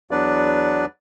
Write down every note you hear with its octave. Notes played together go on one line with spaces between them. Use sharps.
E2 F#3 B3 D4 B4 D5